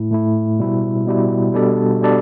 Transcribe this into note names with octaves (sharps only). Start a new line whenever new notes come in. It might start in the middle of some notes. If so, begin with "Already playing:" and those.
Already playing: A2 A3 E4
A2 A3 E4
B2 G3 E4
B2 G3 E4
B2 G3 D4 A4 D5
B2 G3 D4 A4 D5